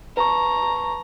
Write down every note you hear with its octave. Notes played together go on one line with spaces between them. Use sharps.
B4 A5 A#5 C#6